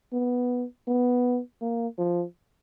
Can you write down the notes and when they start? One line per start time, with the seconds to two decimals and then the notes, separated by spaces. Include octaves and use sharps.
0.13 B3
0.88 B3
1.61 A#3
1.99 F3